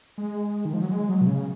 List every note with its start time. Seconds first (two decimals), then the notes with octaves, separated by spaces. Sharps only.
0.18 G#3
0.65 D#3
0.73 F3
0.82 F#3
0.91 G#3
1.09 F#3
1.21 B2
1.27 C#3